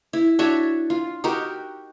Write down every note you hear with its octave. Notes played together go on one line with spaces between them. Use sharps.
E4
D4 F#4 C#5 E5
F4
D#4 F#4 G4 A#4